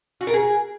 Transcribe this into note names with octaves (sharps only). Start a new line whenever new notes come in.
F#4
A#4
G#4